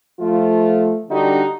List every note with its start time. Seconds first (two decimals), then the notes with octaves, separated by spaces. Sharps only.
0.20 F3 A3 F4
1.09 D3 G3 D4 D#4 F#4 G4